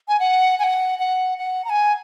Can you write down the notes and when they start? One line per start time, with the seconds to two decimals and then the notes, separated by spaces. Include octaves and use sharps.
0.08 G#5
0.20 F#5
0.59 G#5
0.64 F#5
0.99 F#5
1.38 F#5
1.65 A#5
1.70 G#5